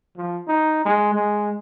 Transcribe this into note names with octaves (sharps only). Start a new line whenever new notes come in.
F3
D#4
G#3
G#3